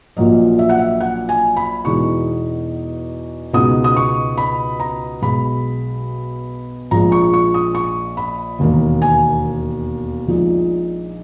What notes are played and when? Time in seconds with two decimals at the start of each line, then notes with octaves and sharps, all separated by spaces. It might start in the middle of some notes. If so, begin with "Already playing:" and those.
0.17 A#1 A#2 F#3 A#3 D#5
0.59 E5
0.69 F#5
0.78 E5
1.00 F#5
1.29 G#5
1.57 B5
1.85 E2 B2 G#3 D#4 C#6
3.53 C#2 B2 G#3 B3 D#4 D#6
3.84 D#6
3.96 C#6
4.38 B5
4.80 A#5
5.22 B1 B2 G#3 B5
6.91 A#1 A#2 G#3 A#5
7.12 C#6
7.34 C#6
7.54 D#6
7.75 C#6
8.17 B5
8.59 E1 D#2 D#3 A#3
9.02 G#5
10.28 A#1 A#2 G#3 D#4